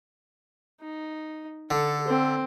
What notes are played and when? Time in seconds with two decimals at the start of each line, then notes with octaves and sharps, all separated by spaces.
0.81 D#4
1.71 D3 A4
2.07 C4